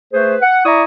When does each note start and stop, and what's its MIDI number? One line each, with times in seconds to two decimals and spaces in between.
0.13 0.36 57
0.13 0.36 68
0.13 0.36 71
0.13 0.36 72
0.42 0.61 78
0.65 0.83 64
0.65 0.83 74
0.65 0.83 76
0.65 0.83 82
0.65 0.83 85
0.65 0.83 87